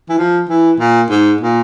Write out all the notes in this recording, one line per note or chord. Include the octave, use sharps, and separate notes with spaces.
E3
F3
E3
A#2
G#2
A#2